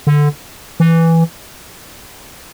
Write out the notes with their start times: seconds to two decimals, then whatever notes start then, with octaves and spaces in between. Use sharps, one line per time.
0.07 D3
0.80 E3